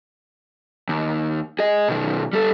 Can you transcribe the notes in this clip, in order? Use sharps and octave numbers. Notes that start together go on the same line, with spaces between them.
D#2
G#4 D#5
B2 D#3
G3 A4